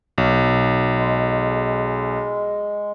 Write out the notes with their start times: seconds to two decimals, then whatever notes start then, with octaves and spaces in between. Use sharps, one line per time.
0.18 B1
0.94 G#3